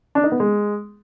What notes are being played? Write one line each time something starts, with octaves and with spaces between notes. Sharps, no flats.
D4
D#4
B3
G#3